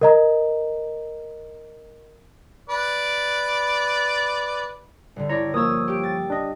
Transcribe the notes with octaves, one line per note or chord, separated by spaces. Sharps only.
A#4 D#5 A#5
B4 D5
G1 D3
E4 C#5 D5 A#5
F3 A#3 C#5 D#6 E6
G4 D7
A6
D4 D#5